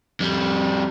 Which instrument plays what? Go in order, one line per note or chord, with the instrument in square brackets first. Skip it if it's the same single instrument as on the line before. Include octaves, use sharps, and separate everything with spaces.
[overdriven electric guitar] F2 G3